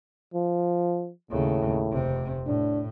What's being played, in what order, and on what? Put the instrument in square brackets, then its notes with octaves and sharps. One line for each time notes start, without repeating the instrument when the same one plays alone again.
[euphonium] F3
[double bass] D#2 C#3 [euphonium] A2
[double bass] F1 C3
[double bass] A2 [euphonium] D4